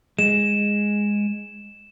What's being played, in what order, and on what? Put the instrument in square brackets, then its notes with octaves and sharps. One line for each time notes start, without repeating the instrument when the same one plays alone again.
[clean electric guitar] G#3 [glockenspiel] E7